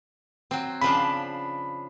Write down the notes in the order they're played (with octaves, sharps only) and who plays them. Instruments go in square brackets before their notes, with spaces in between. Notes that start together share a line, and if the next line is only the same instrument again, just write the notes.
[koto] F#3 C4
[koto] C#3 F3 D4 [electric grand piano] B5